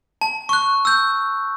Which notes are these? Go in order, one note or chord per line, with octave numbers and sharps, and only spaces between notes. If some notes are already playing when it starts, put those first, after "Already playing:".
A5
C#6 F#6
E6 G6